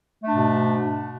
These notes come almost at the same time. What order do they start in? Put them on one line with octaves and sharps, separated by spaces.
A3 D4 G#2 B2